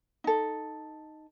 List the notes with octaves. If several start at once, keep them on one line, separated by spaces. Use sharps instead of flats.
D#4 A4